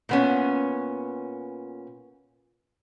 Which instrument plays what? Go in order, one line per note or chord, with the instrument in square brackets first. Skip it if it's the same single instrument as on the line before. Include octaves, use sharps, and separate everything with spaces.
[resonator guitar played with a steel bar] A#2 B3 C#4